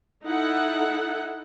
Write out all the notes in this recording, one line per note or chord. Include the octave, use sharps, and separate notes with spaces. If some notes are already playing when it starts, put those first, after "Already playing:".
D#4 E4 A4 F#5